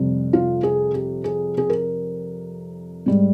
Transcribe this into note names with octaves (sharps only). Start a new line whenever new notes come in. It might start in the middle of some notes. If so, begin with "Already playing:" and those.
Already playing: F2 C3 G3
F4
G#4
G4
G#4
G#4
A#4
G#2 G3